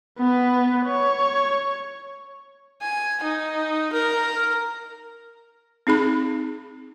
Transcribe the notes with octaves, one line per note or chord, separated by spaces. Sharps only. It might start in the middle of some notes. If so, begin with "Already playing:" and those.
B3 B4
C#5
G#5
D#4
A#4
C4 D#4 G#4 B5